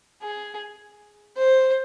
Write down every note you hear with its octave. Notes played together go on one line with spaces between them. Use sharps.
G#4
C5